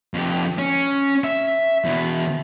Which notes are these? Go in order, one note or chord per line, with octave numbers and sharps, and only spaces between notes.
F2 G4
C#4
E5
E2 B2